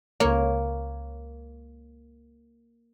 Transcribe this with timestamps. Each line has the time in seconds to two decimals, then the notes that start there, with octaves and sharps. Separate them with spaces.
0.20 C#2 A#3 C#5